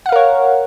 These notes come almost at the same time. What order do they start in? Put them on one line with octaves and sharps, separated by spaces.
F#5 F5 A#4 C#5